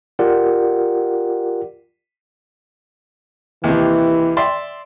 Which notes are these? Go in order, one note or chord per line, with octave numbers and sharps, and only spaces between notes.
F4 G4 A#4 D5 F#5
D#2 C3 E3
D5 E5 C6